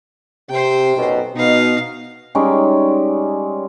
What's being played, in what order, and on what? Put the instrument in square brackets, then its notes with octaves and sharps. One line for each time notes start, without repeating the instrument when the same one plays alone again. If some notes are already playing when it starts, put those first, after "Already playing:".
[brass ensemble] C3 [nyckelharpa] C5 G5
[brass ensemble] B1 F#2 B2
[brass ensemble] B2 [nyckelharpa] D#4 F5
[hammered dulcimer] G3 G#3 C#4 D#4